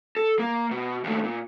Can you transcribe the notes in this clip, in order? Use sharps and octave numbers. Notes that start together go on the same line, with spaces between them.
A4
A#3
B2
D#2 A3
A#2